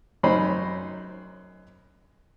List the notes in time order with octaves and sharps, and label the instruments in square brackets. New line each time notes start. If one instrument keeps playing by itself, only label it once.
[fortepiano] F#2 D#4 C5 B5